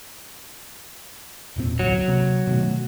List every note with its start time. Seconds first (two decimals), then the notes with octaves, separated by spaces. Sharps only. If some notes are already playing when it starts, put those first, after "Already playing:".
1.56 E1 A#2 C4
1.79 A1 D2 F#3
2.08 C3 A#3
2.47 B2 D#3 A3